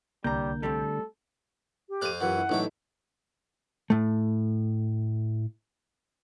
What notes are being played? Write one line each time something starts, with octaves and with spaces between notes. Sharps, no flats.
C2 D3 G3 A#3 A#5 G6
G3 A3 C4 A4
G4
F2 C5 F5 F#6 D#7
F#2 E3 F4 G4 F#5
E4
A1 F#3 D#4 E4 A4 G5
A2 A3